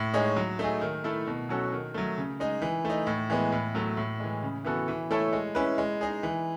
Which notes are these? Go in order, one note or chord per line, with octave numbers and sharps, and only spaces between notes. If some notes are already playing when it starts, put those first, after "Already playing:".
Already playing: A2
G#3 D#4 G#4 C#5
F#3
A3 D#4 G#4
D#3
A3 E4 A4
B2
F#3 C#4 F#4 A4
D#3
F#3 A3
C#3
G#3 D#4
E3
A3 D#4
A2
E3 G#3 B3
A2
F#3 A3
A2
E3 G#3
C#3
E3 B3 F#4 A4
E3
A3 E4 A4 C#5
G#3
C#4 E4 B4
G#3
D#4 G#4
E3